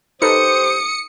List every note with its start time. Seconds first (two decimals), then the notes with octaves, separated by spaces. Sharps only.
0.22 D#4 G4 A4 B4 C5 D#6 C#7